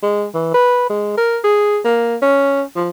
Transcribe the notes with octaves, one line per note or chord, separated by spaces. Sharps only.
G#3
E3
B4
G#3
A#4
G#4
A#3
C#4
F3